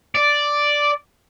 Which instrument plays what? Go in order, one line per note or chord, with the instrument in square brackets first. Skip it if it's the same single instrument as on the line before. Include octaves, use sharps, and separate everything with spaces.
[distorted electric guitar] D5